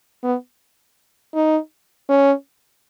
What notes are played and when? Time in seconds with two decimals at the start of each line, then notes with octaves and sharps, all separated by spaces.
0.23 B3
1.35 D#4
2.09 C#4